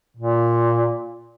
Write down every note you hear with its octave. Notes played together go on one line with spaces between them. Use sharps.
A#2